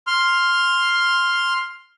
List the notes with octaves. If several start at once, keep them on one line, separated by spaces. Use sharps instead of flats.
C6 F6